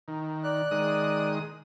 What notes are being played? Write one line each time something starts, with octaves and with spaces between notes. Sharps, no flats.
D#3
D5 F#6
D#3 G#3 D#6